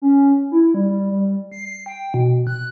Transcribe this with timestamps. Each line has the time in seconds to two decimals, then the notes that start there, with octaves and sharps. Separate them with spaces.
0.02 C#4
0.52 E4
0.74 G3
1.11 G3
1.52 C7
1.86 G5
2.14 B2
2.47 F#6